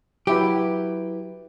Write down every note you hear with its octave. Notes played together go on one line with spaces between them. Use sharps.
F#3 E4 G4 B4